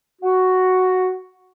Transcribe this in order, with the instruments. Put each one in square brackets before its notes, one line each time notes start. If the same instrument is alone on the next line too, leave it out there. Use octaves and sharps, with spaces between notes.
[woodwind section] F#4